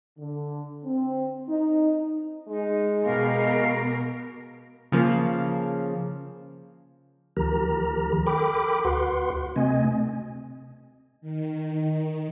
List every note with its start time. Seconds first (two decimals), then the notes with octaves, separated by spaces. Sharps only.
0.19 D3
0.85 C4
1.49 D#4
2.48 G#3 D#4
3.03 B2 B3 G4 A#4 D#5 F5
4.92 C#3 F3 A#3
7.37 D2 D#3 F3 G4 A#4 A#5
8.27 A4 A#4 G5 B5 D6
8.85 D2 F#4 B4 F#5 C6
9.56 C3 A3 C4 D#5 G#5
11.21 D#3